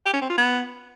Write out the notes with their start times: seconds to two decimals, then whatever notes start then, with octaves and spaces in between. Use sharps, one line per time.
0.06 G4
0.14 C#4
0.22 C4
0.30 F4
0.38 B3